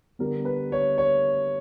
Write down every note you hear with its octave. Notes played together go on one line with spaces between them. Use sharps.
D3 G3 B3 A#4
B4
C#5
C#5